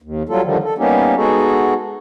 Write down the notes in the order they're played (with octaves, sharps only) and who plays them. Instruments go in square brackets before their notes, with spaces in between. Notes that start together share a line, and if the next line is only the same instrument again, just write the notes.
[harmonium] D#2
F#3 G3 F4 A4
D3 D#3 F3 G3
A4
G3 A#3 B3 C#4 D#4 G4
G#3 B3 D#4 F#4 G#4 A4